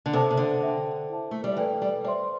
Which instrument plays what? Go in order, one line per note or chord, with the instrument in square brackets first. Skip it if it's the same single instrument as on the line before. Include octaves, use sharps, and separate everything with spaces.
[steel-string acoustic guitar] D3
[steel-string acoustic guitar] C3 [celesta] A4 C5 A5 D6
[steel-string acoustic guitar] C3
D3
[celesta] A4 C5 E5 G5 D6
E4 C5 A5
[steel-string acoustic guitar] A3
G3
[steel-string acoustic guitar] E3 [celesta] A4 D5 G5
[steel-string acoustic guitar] G3
[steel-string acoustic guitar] G3 [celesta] C5 E5 C6